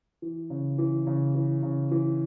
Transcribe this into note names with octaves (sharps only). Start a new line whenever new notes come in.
E3
C#3
E3
C#3
E3
C#3
E3